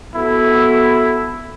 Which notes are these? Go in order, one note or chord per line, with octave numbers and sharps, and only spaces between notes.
B3 E4 F#4 A4